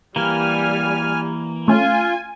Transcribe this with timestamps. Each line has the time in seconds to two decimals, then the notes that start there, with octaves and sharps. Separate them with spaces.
0.16 E3 G3 A#3 G#5 F6
1.68 A3 C#4 F4 G#5